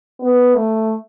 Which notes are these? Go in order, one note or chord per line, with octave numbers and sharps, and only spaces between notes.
B3
A3